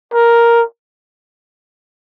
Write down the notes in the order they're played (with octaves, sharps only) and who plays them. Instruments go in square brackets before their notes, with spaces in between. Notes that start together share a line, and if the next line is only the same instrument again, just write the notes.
[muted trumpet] A#4